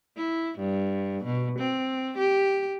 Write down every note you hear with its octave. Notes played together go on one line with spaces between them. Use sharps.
E4
G2
B2
C4
G4